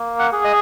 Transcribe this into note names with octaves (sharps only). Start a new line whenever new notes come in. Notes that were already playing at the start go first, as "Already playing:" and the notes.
Already playing: A#3
F#5
G#4
D#5